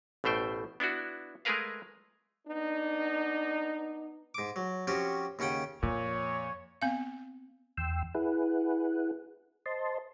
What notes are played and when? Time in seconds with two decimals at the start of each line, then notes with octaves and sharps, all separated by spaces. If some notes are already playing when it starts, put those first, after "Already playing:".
0.24 A1 B2 A3 C5 G5
0.80 B3 D4 E4 F#4
1.45 G#3 A3 G#4 A#4 B4 F5
2.47 B3 D4 D#4
4.34 G#2 D6
4.56 F#3
4.87 F3 C4 C#4 F#4 G4
5.39 D#2 C#3 C#4 F#5 G5
5.82 F2 A#2 F3 C#5
6.82 B3 C4 F5
7.77 E2 G5 C6 E6
8.15 E4 G#4 B4 F#5
9.66 C5 D#5 A5 C6